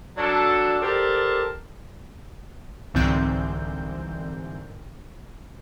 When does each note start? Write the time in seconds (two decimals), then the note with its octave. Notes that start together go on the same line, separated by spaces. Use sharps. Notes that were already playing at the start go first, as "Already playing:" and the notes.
0.17 F#3 D4 A4
0.81 G4 A4 A#4 C5 D5 A5
2.94 C2 G#2 D3 E3 C4 G6